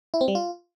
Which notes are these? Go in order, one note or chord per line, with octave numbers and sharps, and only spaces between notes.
E4
C4
G3
F4